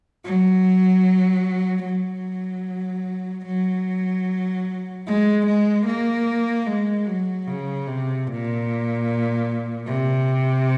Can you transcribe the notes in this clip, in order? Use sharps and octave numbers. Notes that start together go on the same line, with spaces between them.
F#3
F#3
F#3
G#3
G#3
A#3
G#3
F#3
C#3
C3
A#2
C3